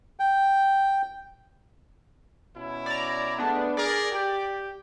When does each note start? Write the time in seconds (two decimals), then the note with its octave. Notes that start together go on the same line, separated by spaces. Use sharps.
0.20 G5
2.55 B2 C#4 E4
2.86 D5 A#5
3.38 G#3 A3 B3 D4
3.77 G#4 A#4 D5
4.12 G4